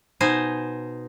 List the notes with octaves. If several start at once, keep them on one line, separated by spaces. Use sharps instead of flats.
B2 D#4 C5 G#5